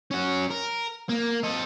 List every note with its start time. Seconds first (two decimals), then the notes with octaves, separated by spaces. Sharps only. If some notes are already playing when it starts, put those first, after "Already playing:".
0.11 C#4 F#4
0.50 A#4
1.09 A#3
1.44 A4 D#5